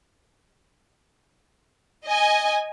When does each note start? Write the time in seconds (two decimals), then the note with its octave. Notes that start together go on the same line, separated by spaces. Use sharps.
2.06 D#5 G#5